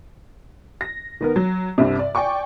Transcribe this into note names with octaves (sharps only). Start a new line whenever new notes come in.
A#6
D#3 B3 A#4
F#3
C2 G2 C3
D5
D5 G5 G#5 C#6 D6